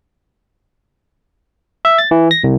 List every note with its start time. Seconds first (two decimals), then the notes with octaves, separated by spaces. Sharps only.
1.85 E5
1.98 A6
2.11 E3
2.31 A#6
2.44 C2